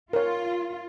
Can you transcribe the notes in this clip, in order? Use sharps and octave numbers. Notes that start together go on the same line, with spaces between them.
F4 A#4 C#5